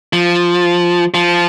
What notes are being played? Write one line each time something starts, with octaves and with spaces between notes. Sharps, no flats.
F3
F3